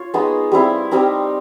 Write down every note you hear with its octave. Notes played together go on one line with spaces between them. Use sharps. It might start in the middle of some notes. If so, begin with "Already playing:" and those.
Already playing: F4 C#5
G#3 B3 D#4
G3 C4 E4
G3 C4 D#4